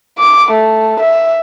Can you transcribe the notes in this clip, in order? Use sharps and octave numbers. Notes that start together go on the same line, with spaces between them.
D6
A3
E5